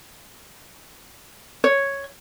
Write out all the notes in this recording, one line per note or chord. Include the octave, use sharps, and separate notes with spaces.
C#5